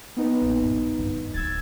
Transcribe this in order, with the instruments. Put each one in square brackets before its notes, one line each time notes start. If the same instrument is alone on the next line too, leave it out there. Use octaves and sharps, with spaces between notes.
[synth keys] B3 D#4 B4
[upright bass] A#1
G2
G2 D4
[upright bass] D1 D#4 [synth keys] E6 G#6 A6